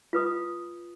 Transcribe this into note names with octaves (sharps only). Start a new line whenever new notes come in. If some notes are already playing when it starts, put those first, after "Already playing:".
F4 B4 D#6